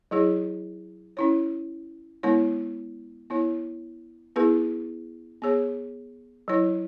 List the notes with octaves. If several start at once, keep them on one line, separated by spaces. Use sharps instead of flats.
F#3 E4 G#4 C#5
C#4 E4 C#5
G#3 B3 E4 C#5
B3 E4 C#5
B3 E4 G#4 B4
B3 G#4 C#5
F#3 E4 C#5